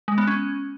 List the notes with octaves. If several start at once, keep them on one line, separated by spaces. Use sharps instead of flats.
G#3
B3
C#4